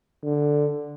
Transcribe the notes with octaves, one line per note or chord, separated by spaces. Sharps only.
D3